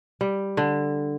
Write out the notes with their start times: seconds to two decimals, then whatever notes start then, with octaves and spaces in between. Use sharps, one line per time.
0.21 G3
0.57 D3